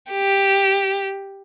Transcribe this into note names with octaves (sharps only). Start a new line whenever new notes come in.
G4